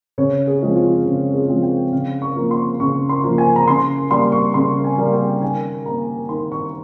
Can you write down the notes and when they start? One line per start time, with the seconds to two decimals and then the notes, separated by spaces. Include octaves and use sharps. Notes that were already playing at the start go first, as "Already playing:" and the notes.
0.18 C#3 C#5
0.47 G#4
0.62 F3 G#3 C4
0.76 F4
1.05 C#3
1.34 G#4
1.49 F3 G#3 C4
1.63 G5
1.92 C#3 F5
2.22 C#6
2.36 F3 A#3
2.51 C6
2.80 C#3 C#6
3.09 C6
3.24 F3 A#3
3.38 G#5
3.56 A#5
3.68 C#3 C6
4.11 G3 A#3 C6
4.32 C#6
4.54 C#3 C6
4.84 G#5
4.98 G3 A#3
5.13 G5
5.41 D#3 G#5
5.86 A#3 A#5
6.29 D#3 C6
6.52 C#6